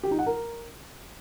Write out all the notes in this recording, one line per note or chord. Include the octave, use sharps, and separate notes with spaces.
G4
D#4
F#5
A#4